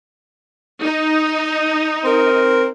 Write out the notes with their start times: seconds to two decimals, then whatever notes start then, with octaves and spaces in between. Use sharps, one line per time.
0.83 D#4
2.04 C4 A#4